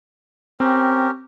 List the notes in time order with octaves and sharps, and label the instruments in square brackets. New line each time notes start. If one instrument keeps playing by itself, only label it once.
[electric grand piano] C4 [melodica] C#4 G4 A#4